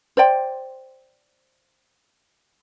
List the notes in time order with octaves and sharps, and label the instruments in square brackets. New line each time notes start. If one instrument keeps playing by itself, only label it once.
[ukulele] C5 D5 G5